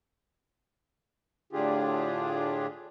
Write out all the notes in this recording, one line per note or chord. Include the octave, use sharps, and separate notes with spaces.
A2 D3 D4 F4 G4 G#4